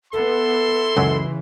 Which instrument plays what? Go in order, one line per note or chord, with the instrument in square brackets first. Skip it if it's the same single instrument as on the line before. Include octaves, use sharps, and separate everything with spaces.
[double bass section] B3 [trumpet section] E4 C6 [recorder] A4
[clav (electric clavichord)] C#2 F#2 F#3 [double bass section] C#3 E3